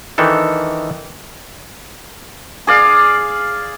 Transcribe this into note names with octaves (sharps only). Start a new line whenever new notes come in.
D#3 E3 D4 A4
G#4 D5 F5